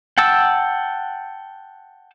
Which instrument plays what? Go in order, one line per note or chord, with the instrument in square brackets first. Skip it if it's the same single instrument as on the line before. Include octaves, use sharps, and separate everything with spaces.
[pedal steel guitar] F#5 G5 A5 E6